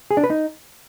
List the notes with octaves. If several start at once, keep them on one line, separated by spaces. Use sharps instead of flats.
G#4
D4
B4
D#4